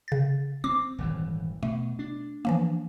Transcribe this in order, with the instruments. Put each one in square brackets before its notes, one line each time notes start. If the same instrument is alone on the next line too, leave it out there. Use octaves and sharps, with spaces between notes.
[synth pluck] C#3 A6
[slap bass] C4 [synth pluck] D6
[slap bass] D#1 G#1 E3
[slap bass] B2 [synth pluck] A3
[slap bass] D4
[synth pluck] E3 F3 A#3